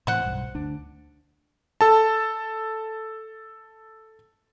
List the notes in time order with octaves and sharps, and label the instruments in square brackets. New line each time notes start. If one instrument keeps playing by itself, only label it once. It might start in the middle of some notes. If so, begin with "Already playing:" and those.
[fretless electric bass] A2 C3 E3 [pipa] C5 F#5
[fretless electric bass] B1 G2
D2 D4
[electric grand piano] A4 A5